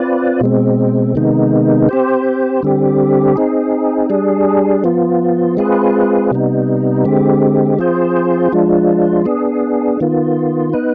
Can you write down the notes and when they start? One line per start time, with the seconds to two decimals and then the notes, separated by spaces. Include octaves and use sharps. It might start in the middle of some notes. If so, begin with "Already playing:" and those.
Already playing: C4 F4 B4 D5
0.41 B2 G#3 C4
1.15 C3 D#3 G#3 B3 D#4
1.89 C4 G4 C5
2.63 D3 G3 C4 G4
3.36 C4 D#4 G#4
4.10 G3 D4 G#4
4.84 F3 B3 F4
5.57 G#3 C4 F4 G#4 B4
6.31 C3 G3 B3 D#4
7.05 D3 G#3 C4 G4
7.79 F3 C4 F4 G#4 C5
8.52 F3 G#3 D4 F4
9.26 B3 D4 G#4
10.00 D#3 B3 F4
10.73 B3 D#4 B4